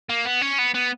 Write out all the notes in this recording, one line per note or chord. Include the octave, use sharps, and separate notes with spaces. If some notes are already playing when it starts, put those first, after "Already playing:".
A#3
B3
C#4
B3
B3